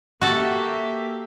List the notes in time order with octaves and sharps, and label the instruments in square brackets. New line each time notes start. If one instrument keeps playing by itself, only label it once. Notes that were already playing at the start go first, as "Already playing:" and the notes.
[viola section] A#3 G4 E5 [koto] F#4 A4